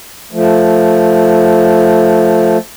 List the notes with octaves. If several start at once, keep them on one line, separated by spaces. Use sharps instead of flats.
F3 A3